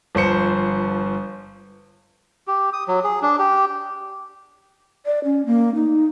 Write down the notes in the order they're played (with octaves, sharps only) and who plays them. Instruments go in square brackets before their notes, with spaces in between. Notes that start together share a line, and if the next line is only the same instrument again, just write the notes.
[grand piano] G1 F3 C5 C#7
[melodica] G4
D#6
F#3
G#4
D4
G4
[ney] D5
C#4
A#3
D#4